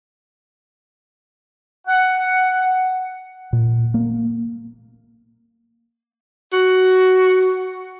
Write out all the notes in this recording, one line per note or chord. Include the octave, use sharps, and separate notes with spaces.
F#5
A#2
A#3
F#4